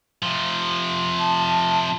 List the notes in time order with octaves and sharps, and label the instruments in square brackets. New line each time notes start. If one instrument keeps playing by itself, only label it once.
[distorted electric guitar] C3 F3
[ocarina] A5